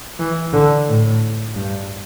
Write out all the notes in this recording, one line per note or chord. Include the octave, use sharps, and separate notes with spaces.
E3
D3
A2
G2